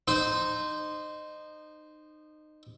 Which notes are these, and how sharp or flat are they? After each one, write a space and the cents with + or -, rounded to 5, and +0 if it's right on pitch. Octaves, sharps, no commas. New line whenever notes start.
D#4 -25 C5 -10